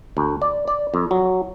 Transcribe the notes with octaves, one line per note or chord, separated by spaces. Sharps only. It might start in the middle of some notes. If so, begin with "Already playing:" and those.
D2
D5
D5
F2
F#3